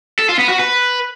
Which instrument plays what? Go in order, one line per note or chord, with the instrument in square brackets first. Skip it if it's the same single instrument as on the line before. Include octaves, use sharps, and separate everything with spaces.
[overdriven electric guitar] A4
F4
B3
F#4
B4